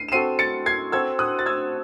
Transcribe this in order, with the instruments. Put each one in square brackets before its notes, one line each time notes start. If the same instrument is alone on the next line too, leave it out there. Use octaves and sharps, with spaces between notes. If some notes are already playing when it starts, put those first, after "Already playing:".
Already playing: [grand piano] C7 D#7
E7
[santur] C4 F#4 A4 [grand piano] C7 D#7
[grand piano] A6 C#7
G#6 C7
[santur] C4 F#4 A4 [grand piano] E6 G#6
[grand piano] D#6 F#6
A6
E6 G#6